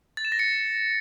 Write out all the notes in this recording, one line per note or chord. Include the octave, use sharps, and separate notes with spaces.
A6
E7
A#6
C#7